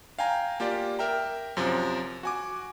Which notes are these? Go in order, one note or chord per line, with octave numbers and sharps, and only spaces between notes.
F5 G5 G#5 A#5
A#3 F4 G4 D5
A#4 E5 G5 A#5
F#2 C3 F3
F#4 G#5 D6